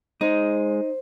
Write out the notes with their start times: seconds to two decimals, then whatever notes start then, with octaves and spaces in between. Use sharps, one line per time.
0.21 G#3 D#4 C5